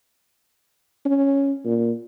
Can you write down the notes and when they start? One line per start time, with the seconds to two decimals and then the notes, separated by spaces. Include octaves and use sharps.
1.06 C#4
1.65 A#2